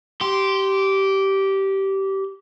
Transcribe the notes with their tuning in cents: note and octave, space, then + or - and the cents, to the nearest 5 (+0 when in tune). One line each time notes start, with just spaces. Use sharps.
G4 -15 C6 +0